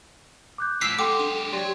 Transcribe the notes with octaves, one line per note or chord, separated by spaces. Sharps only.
D6 F#6 G6
A2 F3 E6 B6 C7
G#3 G4 A4 F#5 G5 C6 D6
D4 D#7
F#3 G4 C#5 D5 G5 C6